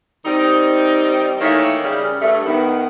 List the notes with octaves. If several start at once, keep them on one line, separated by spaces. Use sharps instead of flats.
D#3 G3 C4 D#4
D#3 E3 A3 A#3 C#5
C#3 G3
G2 A3
D#3 B3